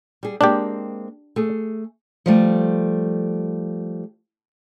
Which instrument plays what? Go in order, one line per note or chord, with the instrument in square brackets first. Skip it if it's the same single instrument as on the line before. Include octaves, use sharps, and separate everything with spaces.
[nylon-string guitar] G3 G#4
[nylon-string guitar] G#3 A#3 C4 [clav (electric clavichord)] D4 G4
[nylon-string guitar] A3 G#4
[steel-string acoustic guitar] F3 G3 A3